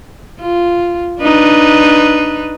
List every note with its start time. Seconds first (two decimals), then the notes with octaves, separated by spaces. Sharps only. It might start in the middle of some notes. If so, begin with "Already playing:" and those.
0.41 F4
1.21 D4 D#4 B4